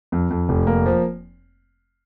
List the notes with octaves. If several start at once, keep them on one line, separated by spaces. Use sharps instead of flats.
F2
F2
F1
A#3
F3